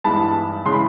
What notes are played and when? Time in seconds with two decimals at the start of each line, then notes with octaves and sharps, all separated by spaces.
0.04 G2 E3 G#3 B3 D#4 A5 B5
0.65 C#3 E3 G#3 C6
0.72 B5